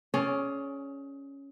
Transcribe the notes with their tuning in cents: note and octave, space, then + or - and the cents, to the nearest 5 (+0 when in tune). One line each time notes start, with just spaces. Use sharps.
C#4 +0 G#4 +25 D5 +0